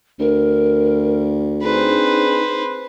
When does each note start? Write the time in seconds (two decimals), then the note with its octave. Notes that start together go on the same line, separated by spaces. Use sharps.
0.19 D2 A#4
1.63 C4 D4 D#4 G#4 B4 C5